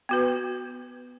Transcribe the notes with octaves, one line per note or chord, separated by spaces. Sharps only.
B3 F#4 B4